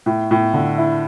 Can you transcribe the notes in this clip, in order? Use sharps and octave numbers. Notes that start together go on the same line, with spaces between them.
A2
A2
D3
E4